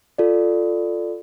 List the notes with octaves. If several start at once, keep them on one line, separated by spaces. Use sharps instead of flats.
F4 A4 D5